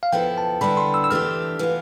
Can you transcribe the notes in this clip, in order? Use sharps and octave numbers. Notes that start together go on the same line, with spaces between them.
F5
F3 B3 E4 A4 G5
A5
D3 G3 B3 E4 B5
C6
E6
E6
E3 A3 D4 G4 F6
E3 B3 F4